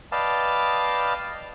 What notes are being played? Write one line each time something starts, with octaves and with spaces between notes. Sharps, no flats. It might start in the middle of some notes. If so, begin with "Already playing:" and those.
B4 D5 D#5 F5 G5 A5